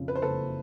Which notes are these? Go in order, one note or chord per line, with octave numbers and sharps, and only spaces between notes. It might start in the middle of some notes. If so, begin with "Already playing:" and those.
Already playing: F2 C#3
B4
C5
F#1 A4 B4